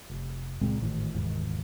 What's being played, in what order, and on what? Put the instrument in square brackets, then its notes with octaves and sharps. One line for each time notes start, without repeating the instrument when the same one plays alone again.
[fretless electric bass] F1
C#2 A#2 G#3 C4
G#1 A2 D#3 E3
F1 D#2 G#2 E3